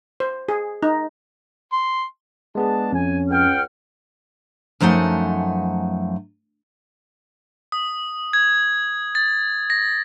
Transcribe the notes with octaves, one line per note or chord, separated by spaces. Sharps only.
C5
G#4
D#4
C6
G#3 B3 D4 G#4 A5
F2 C#4 G#5
C#2 F#5 G5 F6
F#2 F3 A3 D#4 F#5 G#5
D#6
G#6
A6
A#6